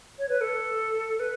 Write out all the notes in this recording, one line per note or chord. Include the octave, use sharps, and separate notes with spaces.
C#5
B4
A4
B4